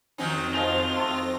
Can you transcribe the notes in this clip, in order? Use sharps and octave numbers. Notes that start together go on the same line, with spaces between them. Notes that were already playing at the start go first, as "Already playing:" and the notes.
F2 D#3 F#3 C4 C#4 D#4 A#6
F3 F4 D#5 G#5
A3 C#6